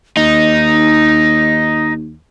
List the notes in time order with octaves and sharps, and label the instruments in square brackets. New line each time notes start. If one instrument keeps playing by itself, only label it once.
[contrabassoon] D#2 [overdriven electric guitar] D#4 [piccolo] A#6